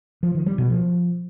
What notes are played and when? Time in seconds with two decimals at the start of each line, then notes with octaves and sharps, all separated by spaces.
0.23 F3
0.35 D#3
0.46 G3
0.58 B2
0.70 F3